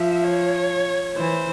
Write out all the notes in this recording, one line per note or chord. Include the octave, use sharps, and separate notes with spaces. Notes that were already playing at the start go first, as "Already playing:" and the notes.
Already playing: F3 E5
C#5
E3 C5